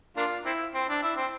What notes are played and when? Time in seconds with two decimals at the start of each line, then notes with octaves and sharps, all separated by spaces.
0.17 A#3 D4 F4
0.45 C4 E4
0.74 C4
0.89 D4
1.02 E4
1.17 C4